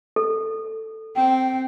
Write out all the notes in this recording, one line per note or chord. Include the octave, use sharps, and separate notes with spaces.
A4
C4 G5